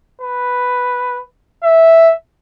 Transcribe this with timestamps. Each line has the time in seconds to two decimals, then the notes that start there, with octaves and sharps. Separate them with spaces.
0.21 B4
1.63 E5